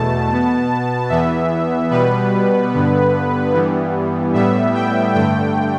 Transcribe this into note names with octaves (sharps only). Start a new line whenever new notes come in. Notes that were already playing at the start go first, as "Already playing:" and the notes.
Already playing: E2 B2 A3 A5
B2 B3
E2 E3 B3 E5
B2 G3 B3 B4
G2 D3 B3
G2 E3 G3 B3
A2 G3 B3 E5
G5
G2 D3 A3 G5